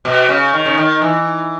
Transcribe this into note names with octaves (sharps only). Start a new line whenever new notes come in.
B2
C#3
D#3
C#3
D#3
E3